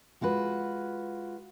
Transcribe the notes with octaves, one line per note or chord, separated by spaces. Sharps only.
G#3 F4 F#4 B4